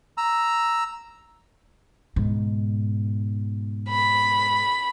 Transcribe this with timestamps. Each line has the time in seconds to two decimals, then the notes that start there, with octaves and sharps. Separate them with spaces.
0.18 A#5 E6
2.16 G#2 B2
3.89 B5